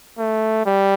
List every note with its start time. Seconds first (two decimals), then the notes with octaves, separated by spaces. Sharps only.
0.19 A3
0.66 G3